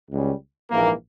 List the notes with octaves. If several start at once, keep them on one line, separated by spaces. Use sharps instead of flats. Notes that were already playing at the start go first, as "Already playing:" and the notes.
C#2 C#3 G3 C#4
A#1 G#2 E3 A#3